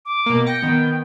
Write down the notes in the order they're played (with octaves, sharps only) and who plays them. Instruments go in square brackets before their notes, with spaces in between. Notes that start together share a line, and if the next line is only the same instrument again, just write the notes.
[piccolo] D6
[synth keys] B2 A#3
[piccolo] G5 [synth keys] A#6 C#7
[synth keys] D#3 B3